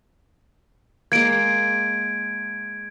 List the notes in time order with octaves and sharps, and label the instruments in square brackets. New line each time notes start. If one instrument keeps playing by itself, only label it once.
[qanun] G#3 A#3 [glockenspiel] G#6 D7